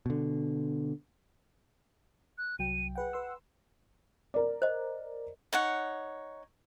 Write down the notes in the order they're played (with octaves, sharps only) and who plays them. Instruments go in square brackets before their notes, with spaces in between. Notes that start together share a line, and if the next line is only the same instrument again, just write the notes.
[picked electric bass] B2 D3
[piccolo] F#6
[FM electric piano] C2 F#3 G5 [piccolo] D#7
[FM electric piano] G#4 B4 G5 [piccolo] F#5
[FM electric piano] B4 C6 E6
[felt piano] A#4 D5
[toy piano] C5 D#5
[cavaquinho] D#4 C#5 F#5